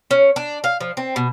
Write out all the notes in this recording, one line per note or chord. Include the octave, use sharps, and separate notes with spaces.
C#4
D4
F5
F3
C4
B2